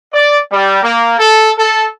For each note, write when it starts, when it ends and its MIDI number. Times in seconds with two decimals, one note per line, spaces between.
0.12 0.38 74
0.51 0.81 55
0.82 1.16 58
1.18 1.50 69
1.58 1.86 69